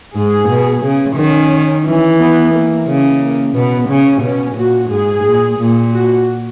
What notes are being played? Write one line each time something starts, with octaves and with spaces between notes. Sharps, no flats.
G#2 G#4
B2
C#3
D#3 C#4
E3
B3
A#3
C#3
A#3
B2 B3
C#3 C#4
B2 C#4
A#2 F#4
G#2 G#4
A#2
A#2
F#4